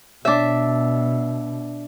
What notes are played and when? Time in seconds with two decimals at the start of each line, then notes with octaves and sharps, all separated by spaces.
0.25 B2 D4 E5